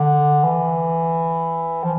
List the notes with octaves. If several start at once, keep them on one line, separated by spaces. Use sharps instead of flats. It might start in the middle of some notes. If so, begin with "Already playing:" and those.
Already playing: D3
E3
F3